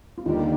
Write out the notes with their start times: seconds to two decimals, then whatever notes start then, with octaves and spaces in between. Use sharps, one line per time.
0.18 F4
0.26 D#2 D3 G3 A#3 D#4